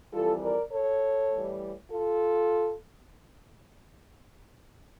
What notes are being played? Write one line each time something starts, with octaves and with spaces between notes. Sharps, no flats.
F2 E3 G3 F4 A4
A#4 D5
A4 C#5
A2 E3 G3
F4 A4